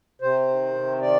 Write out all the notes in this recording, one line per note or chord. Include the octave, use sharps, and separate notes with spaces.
C3 C5
D#3
C3
D#3 D5